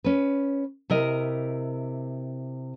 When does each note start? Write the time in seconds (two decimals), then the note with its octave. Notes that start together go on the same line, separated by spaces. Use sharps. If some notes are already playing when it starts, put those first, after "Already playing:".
0.04 C#4 B4
0.90 C3 E4 A#4 D#5